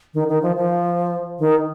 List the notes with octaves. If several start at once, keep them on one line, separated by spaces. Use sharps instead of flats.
D#3
D#3
F3
F3
D#3